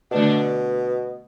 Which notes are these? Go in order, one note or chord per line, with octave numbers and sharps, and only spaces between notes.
B2 D3 A3 D4